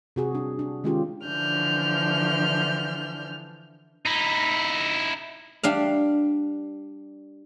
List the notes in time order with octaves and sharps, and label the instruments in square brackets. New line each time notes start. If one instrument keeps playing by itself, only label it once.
[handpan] C3 F#4 G#4
G3 D4
D4
D#3 G#3 C#4 D4 F4 G4
[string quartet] D3 E3 F3 D4 F6 G6
[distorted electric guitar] D#4 E4
[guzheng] G3 D4 F5